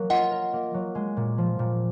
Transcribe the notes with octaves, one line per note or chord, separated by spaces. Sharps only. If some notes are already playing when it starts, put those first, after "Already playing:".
Already playing: F#3 A#3 A#4
F4 D#5 F#5
A#4
A#3
F#3
G#3
A#2
F3
A#2